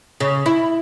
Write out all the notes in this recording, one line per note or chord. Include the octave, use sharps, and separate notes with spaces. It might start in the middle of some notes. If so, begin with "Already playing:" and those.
C#3
E4